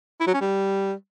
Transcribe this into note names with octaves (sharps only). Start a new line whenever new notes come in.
E4
F#3
C#4
G3